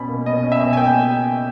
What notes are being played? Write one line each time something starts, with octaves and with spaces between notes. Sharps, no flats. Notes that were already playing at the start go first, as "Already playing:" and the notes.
Already playing: B2 C#4 B5
A#3
B2 D#5
C#4
E5
B2
G#5
A#3 G5